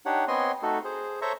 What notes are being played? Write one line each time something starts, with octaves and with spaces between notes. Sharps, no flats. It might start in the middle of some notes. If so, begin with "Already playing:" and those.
D4 D#4 G4 C#5 F#5
B3 C4 C#5 D#5 G#5 C6
A3 D#4 F#4 A4
G#4 C5
A4 C5 C#5 E5 A#5 C#6